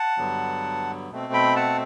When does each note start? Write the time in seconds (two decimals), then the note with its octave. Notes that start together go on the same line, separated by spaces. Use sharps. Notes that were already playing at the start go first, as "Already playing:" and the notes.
Already playing: F#5 A5
0.18 G2 D3 F#3 B3
1.09 B2 A3 C4
1.33 G5 B5
1.56 F#5 A5